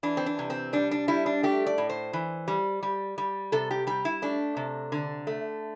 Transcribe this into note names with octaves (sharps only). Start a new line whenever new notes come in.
E3 D4
C4
D4
C3
C4
G3 D4
D4
G3 E4
D4
A3 G4
D5
A2
C5
E3
G3
G3
G3
C3 A4
G4
G3 G4
E4
A3 D4
C3
D3
A3